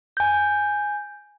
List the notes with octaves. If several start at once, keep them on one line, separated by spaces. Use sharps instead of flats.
G#5 G6